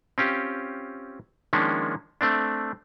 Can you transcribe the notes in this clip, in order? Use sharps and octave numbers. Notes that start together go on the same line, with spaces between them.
C4 C#4 F4 G4
D#3 F3 G#3 A#3 C#4 D4
A3 C4 D4